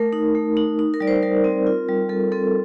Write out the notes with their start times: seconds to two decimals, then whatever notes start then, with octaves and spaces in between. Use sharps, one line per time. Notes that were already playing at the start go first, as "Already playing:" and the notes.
Already playing: A3 A#4
0.13 D#4
0.35 A3
0.57 D#4
0.79 D#4
0.94 A#4
1.00 G3 D5
1.07 C5
1.23 G3 A#4
1.44 C4
1.67 F4
1.89 G3
2.09 G3 A4
2.32 C4 A4